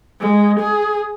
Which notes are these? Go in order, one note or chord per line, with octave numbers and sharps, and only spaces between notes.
G#3
G#4